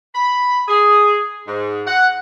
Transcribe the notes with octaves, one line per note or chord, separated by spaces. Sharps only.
B5
G#4
G#2
F#5